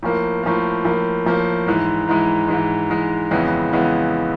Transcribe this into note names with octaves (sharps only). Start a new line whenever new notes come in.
A2 F3 A#3
A2 F3 A#3
A2 F3 A#3
A2 F3 A#3
G#2 E3 G#3
G#2 E3 G#3
G#2 E3 G#3
G#2 E3 G#3
F2 C#3 E3 G#3 B3
C#3 E3 G#3 B3